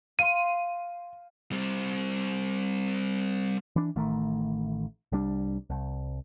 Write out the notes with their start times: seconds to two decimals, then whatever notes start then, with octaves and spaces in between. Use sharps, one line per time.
0.19 F5 C6 D#7
1.52 G3 C4
3.76 E3 D4
3.96 A1 D#3 A3
5.12 C2 G3 D4
5.70 C2